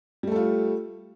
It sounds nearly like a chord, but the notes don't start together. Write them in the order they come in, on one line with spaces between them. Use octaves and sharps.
G3 A3 A4 F4